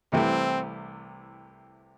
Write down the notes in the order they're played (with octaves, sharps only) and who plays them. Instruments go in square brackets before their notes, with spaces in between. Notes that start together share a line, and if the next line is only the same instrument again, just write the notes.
[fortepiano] C2 C3 E3 A3 E4 [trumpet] C4